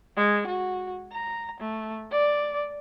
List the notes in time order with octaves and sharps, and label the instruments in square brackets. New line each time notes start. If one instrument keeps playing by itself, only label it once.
[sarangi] G#3
F#4
A#5
A3
D5